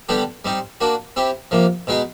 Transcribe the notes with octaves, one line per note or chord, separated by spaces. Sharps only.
D3 G3 B3 D4 G4
G3 C4 D#4
A#3 D4 F#4
C4 E4 G4
C3 F3 A#3
B2 G#3 B3 D#4 G#4